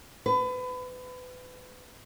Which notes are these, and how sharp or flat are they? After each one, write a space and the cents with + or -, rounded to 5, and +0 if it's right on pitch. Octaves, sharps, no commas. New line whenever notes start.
B4 +30